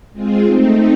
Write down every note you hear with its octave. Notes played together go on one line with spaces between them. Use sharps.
G#3 C4 F4 G#4
A3 C4 D#4